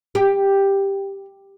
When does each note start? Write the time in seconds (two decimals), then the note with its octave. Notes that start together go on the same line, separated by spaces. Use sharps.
0.15 G4